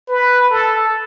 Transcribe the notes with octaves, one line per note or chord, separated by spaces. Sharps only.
B4
A4